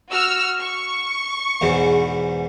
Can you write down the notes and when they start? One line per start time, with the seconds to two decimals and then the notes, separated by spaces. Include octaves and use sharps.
0.11 F#4 E6 F6
0.59 C#6
1.61 E2 G#2 B2